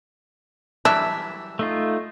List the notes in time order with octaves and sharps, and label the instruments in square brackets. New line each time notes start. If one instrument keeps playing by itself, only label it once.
[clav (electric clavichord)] E3 F#3 G3 [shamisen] D4 [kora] E5
[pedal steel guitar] A3 D#4 F4